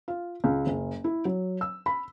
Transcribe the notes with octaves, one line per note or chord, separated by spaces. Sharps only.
F4
C#2
F#1
E4
F#3
E6
B5